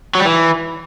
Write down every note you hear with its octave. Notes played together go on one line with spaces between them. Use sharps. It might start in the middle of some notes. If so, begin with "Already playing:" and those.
F#3
G3
E3